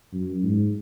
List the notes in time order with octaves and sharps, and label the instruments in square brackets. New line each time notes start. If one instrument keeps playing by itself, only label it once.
[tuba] F#2
G#2